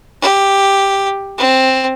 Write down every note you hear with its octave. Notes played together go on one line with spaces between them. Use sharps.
G4
C4